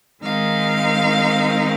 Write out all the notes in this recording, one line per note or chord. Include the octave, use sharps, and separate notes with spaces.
D#3 G#3 C4 D#4 F5